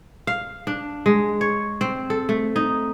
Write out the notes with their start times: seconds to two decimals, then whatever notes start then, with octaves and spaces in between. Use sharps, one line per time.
0.27 F5
0.67 D4
1.06 G#3
1.41 C#5
1.81 C4
2.10 A4
2.29 A3
2.56 D#4